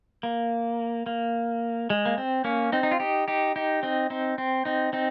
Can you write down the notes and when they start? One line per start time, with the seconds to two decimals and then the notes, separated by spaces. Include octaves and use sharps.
0.23 A#3
1.06 A#3
1.90 G#3
2.06 A#3
2.18 C4
2.44 A#3 C#4
2.72 C4 D#4
2.83 D#4
2.91 F4
3.00 D#4 G4
3.28 D#4 G4
3.56 D#4 G4
3.83 C4 D#4
4.10 C4 D#4
4.38 C4
4.65 C4 D#4
4.93 C4 D#4